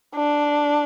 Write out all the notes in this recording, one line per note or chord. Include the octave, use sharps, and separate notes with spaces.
D4